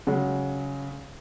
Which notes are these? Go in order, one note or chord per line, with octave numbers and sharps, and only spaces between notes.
C#3 F#3 G#3